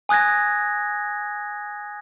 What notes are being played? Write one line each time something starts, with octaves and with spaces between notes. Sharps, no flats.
G#5 D#6 F#6 G#6 A#6